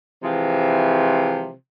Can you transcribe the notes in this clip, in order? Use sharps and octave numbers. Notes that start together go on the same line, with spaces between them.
C3 E3 F3 G#3 C4